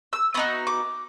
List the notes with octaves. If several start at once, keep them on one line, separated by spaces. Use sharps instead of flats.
E6
B3 D#4 F#4 D#6
D6